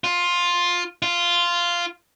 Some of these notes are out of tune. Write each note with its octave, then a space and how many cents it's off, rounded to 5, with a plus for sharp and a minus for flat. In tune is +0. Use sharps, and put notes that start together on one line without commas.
F4 +10
F4 -5